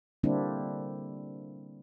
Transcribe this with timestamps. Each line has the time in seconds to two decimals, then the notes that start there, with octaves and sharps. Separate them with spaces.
0.23 D3 G3 A#3 C4 D4 E4